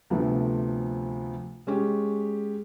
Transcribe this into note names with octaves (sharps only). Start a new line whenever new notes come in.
D2 C3 F3 A3 B3
G#3 C#4 G4